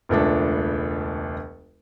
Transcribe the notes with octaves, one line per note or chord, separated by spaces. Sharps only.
E1 C#2 A3 D4